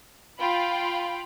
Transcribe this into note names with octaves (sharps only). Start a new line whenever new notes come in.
F4 G5 B5